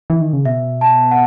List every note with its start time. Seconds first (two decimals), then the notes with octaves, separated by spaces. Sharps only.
0.10 E3
0.21 D#3
0.33 C#3
0.45 B2 E5
0.81 A5
1.11 F#5